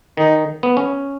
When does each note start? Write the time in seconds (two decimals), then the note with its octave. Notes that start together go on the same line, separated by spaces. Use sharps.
0.17 D#3 D#4
0.63 B3
0.77 C#4